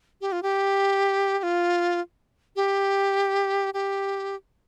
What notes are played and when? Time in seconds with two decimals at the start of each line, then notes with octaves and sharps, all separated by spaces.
0.21 G4
0.32 F4
0.43 G4
1.39 G4
1.43 F4
2.56 G4
3.74 G4